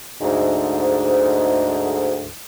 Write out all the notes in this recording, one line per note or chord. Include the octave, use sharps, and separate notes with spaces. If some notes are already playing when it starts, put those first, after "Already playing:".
D2 G#2